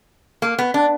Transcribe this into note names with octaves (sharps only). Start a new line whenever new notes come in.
A#3
B3
D4